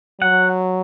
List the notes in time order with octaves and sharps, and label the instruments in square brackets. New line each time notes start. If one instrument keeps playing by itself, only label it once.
[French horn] F#3 [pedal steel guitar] F#5